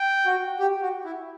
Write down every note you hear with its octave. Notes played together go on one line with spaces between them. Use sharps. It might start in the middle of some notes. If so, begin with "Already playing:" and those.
Already playing: G5
F#4
G4
F#4
E4